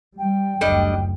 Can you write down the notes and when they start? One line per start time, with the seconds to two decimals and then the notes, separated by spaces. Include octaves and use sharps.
0.19 G3 G5
0.61 F#1 D2 G3 D4 D#5